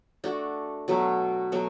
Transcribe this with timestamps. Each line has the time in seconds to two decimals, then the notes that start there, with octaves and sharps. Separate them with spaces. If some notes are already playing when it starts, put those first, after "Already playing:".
0.24 A3 D4 F#4
0.88 B2 F#3 A3
1.52 B2 F#3 A3